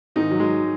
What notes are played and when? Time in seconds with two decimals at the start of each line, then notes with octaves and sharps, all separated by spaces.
0.16 G#2 D#3 D#4
0.31 F#3
0.40 G#3